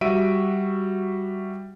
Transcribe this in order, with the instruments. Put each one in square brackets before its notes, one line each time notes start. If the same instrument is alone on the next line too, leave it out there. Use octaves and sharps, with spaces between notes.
[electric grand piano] G3 F#4 E5 D7 D#7